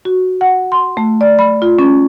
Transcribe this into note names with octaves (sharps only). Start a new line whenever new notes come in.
F#4
F#5
C6
A3
D5
B5
F4
C#4